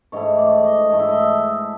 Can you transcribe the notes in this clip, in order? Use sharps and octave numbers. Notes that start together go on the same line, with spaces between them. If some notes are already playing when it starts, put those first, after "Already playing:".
G#2 E3 A3 C#5
D5
D#5
G#2 E3 A3
E5
D#5
E5